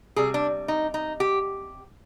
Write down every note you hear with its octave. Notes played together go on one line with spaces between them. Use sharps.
C3 G3 G#4
D4
D#4
D#4
G4